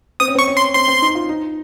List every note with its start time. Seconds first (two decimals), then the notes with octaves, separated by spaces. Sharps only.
0.20 C4 D#6
0.28 C#4
0.35 C4
0.39 C#6
0.48 C#4
0.57 C6
0.75 C4 C6
0.88 C4
1.02 D#4
1.15 F4
1.29 D#4